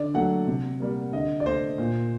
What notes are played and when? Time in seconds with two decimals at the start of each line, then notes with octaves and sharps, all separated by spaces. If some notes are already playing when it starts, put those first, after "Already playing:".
Already playing: D3 D5
0.14 F#3 A3 F#5
0.47 C3
0.80 G3 A#3
1.13 D3 D#5
1.40 D5
1.46 A3 C5
1.78 A#2